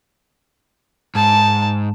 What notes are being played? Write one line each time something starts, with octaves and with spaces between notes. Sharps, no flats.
G#2 A5